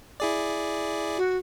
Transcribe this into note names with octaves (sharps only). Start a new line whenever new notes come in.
E4 G#4 D5
F#4